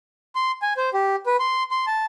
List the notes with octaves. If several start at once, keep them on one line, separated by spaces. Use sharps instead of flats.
C6
G#5
C5
G4
B4
C6
C6
A5